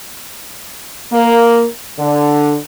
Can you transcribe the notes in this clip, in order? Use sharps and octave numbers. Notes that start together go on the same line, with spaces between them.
A#3
D3